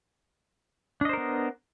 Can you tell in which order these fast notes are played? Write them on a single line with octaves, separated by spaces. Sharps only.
D4 D#5 C5 A#4 B3